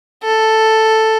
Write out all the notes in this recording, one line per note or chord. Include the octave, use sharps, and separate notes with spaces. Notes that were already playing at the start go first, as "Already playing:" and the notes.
A4